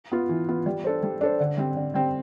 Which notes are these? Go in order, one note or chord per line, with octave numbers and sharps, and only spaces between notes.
B3 F4
E3
B3 F4
G3
D4 A4 C5
G3
D4 A4 C5
D3
G3 C4
D3
G3 C4